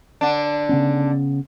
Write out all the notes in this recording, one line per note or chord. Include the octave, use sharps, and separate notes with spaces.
D3 D4
C#3 B3 C#4